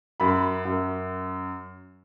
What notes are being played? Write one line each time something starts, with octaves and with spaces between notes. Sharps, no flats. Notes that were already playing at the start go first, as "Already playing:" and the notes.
F#2 B5
F#2